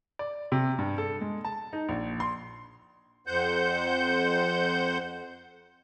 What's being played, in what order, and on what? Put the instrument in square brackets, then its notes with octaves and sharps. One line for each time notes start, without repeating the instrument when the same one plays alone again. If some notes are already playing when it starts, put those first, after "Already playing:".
[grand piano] D5
C3
G2
A4
G#3
A5
D#4
A#1
C6
[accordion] F2 C5 F#5 G6